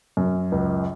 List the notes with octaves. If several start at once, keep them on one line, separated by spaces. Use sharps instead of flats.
F#2
C#2